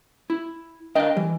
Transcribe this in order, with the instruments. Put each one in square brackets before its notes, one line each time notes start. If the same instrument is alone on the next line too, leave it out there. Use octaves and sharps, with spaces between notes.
[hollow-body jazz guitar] E4
[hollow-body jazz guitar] D4 A#4 G5 [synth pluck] D#5 F5
[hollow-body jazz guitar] E3 [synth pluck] G3